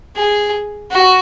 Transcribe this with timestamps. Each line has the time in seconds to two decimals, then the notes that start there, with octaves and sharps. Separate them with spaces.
0.16 G#4
0.91 F#4